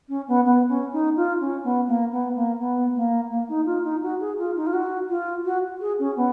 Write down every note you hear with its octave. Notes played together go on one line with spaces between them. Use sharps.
C#4
B3
B3
C#4
D#4
F4
C#4
B3
A#3
B3
A#3
B3
A#3
A#3
D#4
F4
D#4
F#4
G#4
F4
D#4
F4
F#4
F4
F#4
G#4
C#4
B3